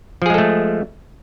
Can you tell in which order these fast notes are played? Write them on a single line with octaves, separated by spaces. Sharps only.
F3 G#4 G#3 A4 A3